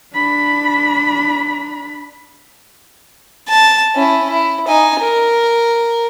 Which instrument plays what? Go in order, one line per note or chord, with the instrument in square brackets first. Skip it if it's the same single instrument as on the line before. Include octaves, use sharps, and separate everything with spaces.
[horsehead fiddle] D4 B5
[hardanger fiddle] A5
C#4 E4
E4
D#4 G#5
A#4